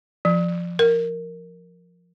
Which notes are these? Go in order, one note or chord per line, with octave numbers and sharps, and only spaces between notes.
F3
A#4